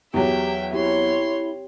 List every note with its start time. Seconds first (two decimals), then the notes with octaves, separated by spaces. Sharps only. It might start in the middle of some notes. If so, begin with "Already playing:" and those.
0.14 E2 F#3 G4 E5 G5
0.73 C4 E4 G4 C#5 C6